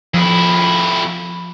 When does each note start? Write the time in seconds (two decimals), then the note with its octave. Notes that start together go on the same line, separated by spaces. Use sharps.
0.14 F2 F3 E4